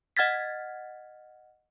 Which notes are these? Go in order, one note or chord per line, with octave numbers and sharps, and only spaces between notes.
D#5 F#5 F6 G#6 A6 B6